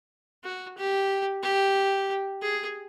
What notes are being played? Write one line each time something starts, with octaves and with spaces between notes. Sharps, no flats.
F#4
G4
G4
G#4